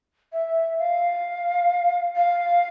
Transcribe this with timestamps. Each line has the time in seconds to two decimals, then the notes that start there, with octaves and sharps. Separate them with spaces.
0.33 E5
0.79 F5
2.16 F5